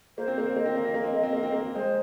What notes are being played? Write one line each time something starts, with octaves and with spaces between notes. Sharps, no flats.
A#3 C5
C4
A#3
C4
A#3 D#5
C4
A#3
C4
A#3
C4
A#3
C4
A#3
C4
A#3
G#3 C5